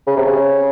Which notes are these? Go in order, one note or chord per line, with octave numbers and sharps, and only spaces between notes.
C#3
C3
C#3